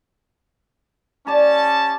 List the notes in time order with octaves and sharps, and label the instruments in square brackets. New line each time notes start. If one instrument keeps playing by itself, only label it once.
[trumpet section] C#4 A5 [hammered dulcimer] G4 D5